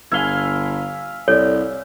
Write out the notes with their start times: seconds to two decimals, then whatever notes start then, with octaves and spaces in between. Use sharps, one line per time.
0.12 G1 E5 F5 G#5 G#6 G7
1.28 C2 A4 C#5 D5